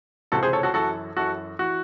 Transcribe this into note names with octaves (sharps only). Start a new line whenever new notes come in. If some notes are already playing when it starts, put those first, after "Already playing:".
C#2 C3 E3 F#4 A4
G#4 C5
A4 C#5
F#4 A4
F#2 E3 F#4 A4
F#2 E3 F#4 A4
E3 F#4